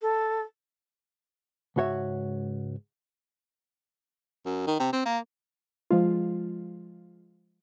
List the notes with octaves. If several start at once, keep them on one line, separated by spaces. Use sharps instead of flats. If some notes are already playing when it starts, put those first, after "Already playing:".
A4
C#2 G#2 F#4 C#5 E5
F#2
D#3
C3
C4
A#3
F3 G#3 F4